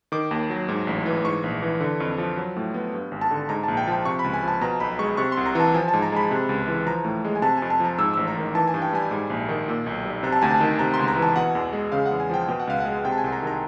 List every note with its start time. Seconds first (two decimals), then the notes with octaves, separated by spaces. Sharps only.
0.12 D#3 D6
0.31 D#2
0.50 F#3
0.68 G#2
0.87 A1
1.06 E3
1.25 G#2 C#6
1.44 A#1
1.62 E3
1.80 D3
2.00 F2
2.18 F3
2.38 F#3
2.56 A2
2.74 B3
2.94 G2
3.11 G#1
3.21 A5
3.31 D3
3.49 G#2 A#5
3.63 A#1 A5
3.77 G5
3.87 F3 G5
4.05 C3 C#6
4.19 B5
4.24 C#2
4.34 G#5
4.43 F3 A5
4.61 B2 A#5
4.80 B1 B5
4.99 G#3 C#6
5.17 C3 C#6
5.32 C2 C6
5.46 A#5
5.55 E3 A5
5.74 F3 G#5
5.88 A5
5.93 G#2
6.02 A#5
6.12 G#3 B5
6.31 C3
6.49 C#2
6.68 E3
6.86 F3 A#5
7.05 A2
7.25 G#3
7.35 G#5
7.42 C3 A5
7.57 F2 G#5
7.70 A5
7.80 F3 A#5
7.98 G#2 E6
8.13 A1 E6
8.28 A#5
8.37 D#3
8.55 E3 A5
8.68 G#5
8.74 G2
8.82 G5
8.93 G3 G#5
9.11 G#2
9.30 A#1
9.49 D#3
9.68 A#2
9.86 B1
10.05 G3
10.23 C3 A#5
10.32 A5
10.42 D2 G#5
10.51 A5
10.61 D#3
10.79 C3 A#5
10.94 C6
10.99 C#2
11.08 A#5
11.17 E3
11.22 A5
11.36 B2 F#5
11.55 E2
11.73 G#3
11.92 C#3 F5
12.06 F#5
12.11 E2
12.20 G#5
12.30 F3 G5
12.48 B2 G5
12.60 F#5
12.67 C#2 F5
12.80 F#5
12.86 G#3
13.05 C3 G5
13.12 A5
13.18 G#5
13.24 C2
13.32 A#5
13.42 D#3 A#5